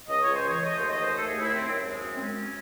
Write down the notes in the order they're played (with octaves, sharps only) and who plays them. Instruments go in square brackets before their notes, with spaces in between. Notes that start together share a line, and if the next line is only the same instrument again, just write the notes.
[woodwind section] C#2 D#5
C#2 C#5
C5
E3 C#5
A3 D#5
D#2 C5
D#5
D#2 C5
A3 A4
D#2 G#4
E4
D#2 C4
F#2 C4
G#3
F#2
C4
G#3 C#4
C#4